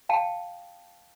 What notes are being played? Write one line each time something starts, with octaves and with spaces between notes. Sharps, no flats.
F5 G5 A5